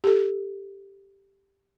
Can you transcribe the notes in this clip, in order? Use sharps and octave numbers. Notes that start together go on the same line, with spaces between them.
G4 A4